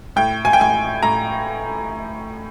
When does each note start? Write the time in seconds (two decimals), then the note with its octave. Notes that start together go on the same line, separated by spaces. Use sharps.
0.16 A2 G5
0.45 G#5
0.53 G5
0.59 A2 G#5
1.03 A2 A#5